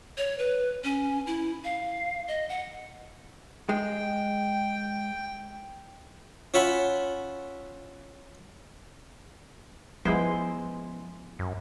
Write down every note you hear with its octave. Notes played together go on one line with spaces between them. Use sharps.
C#5
B4
C#4
E4
F5
D#5
F#5
G#3 G5
C#4 F4 E5 F#5 G#5 B5
F3 G#3 B3 C#4 E4 C5
F#2